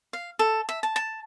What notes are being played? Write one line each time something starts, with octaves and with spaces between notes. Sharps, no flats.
F5
A4
E5
A5
A5